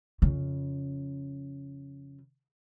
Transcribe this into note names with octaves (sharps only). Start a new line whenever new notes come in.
F2 C#3